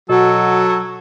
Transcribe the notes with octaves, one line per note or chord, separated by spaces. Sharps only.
B2 F#3 F#4 A4